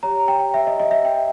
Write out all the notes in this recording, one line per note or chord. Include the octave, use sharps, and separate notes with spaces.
G4 C#5 A#5
G5
E5
D#5
D#5
E5
G5